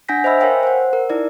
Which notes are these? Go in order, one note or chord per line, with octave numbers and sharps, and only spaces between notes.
D4 F#5 G#5 G6 A#6 B6
C5 D#5 E5 B5 E6
A#4 C#5 F5 G5 G#5
C5 F#5
A#4
D#4 E4 D5